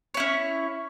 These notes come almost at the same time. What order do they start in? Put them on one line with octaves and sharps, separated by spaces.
C#5 E4 C#4